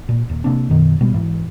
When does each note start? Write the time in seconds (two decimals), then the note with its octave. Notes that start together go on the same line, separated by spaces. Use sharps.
0.09 A#2
0.29 D#1
0.44 C3 A#3 C4 D4
0.69 F#2 B2 D#3
1.01 B2 G3
1.14 G#2 E3